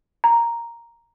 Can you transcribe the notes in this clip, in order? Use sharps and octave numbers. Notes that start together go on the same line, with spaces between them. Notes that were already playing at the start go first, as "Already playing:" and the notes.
A#5